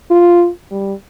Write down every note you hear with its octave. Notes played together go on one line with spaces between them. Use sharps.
F4
G3